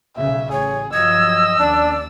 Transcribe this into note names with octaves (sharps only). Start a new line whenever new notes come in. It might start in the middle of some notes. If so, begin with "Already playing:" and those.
B1 C#3 E5
A1 G#4 C#5
G2 F3 F#3 D#5 E6 G#6
D#2 C#4 D4 D5